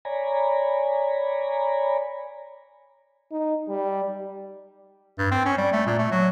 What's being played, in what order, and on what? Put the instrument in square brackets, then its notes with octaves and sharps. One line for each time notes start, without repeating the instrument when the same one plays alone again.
[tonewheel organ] C#5 D5 G#5 A#5 B5
[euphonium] D#4
G3
[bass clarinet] G2
C4
C#4
G3
A3
A#2
A3
F#3